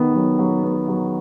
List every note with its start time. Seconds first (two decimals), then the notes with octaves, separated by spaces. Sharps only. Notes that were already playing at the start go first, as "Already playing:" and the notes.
Already playing: D#3 B3
0.15 F#3
0.39 F#3
0.64 B3
0.88 F#3